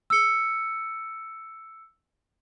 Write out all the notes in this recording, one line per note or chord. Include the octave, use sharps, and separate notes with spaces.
E6 C#7